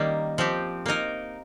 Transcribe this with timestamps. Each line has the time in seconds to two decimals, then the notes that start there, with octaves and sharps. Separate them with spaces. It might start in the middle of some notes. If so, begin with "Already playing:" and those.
Already playing: D#3 G3 A#3 C#4
0.38 F3 C4 G4
0.86 A#3 D#4 A#4